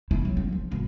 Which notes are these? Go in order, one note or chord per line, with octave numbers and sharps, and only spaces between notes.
E4
F#3
C#4
F3
G#1